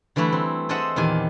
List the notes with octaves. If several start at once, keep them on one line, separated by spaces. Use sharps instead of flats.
D3 E3 G3 A3 E4
C4
G#4 A4 C5 D#5 E5 F#5
E2 A#2 D#3 G4 G#5